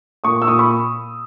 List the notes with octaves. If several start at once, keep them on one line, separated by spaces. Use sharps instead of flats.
A#2 C#6 D#6
E6
A#2 C#6 D#6
B5 C#6